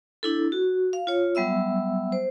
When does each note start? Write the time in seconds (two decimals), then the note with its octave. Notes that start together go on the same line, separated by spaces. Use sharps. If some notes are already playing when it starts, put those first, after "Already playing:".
0.23 D4 E4 A4
0.52 F#4
0.93 F5
1.07 F4 C#5
1.35 F#3 G3 B3 E5 E6
2.12 C5